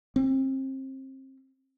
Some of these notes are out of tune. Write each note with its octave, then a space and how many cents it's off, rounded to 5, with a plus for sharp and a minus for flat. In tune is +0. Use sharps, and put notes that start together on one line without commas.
C4 +30